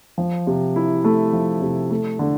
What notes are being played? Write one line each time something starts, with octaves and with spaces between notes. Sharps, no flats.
F3
C3
E4
A3
F3
C3
A3
D3